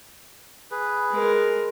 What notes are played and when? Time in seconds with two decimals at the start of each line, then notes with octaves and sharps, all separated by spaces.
0.71 G#4 B4
1.11 G#3 A#4